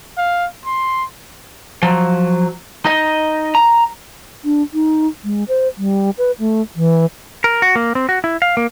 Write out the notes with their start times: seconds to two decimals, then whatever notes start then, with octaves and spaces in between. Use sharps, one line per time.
0.18 F5
0.66 C6
1.83 F3 F#3
2.85 D#4 D#5
3.55 A#5
4.45 D4
4.73 D#4
5.24 G#3
5.48 C5
5.77 G3
6.18 B4
6.39 A3
6.76 E3
7.44 A#4
7.62 F#4
7.76 A#3
7.95 C4
8.09 F#4
8.24 E4
8.42 F5
8.57 A#3